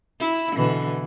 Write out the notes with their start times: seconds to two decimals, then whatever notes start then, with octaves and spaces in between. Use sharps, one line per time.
0.20 E4
0.56 B2 D3 E3